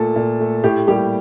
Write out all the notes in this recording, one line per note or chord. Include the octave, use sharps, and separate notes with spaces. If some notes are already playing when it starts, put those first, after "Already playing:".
Already playing: A#2 A3 A4
A#2
A3
A2 G4
G3 A#3 G4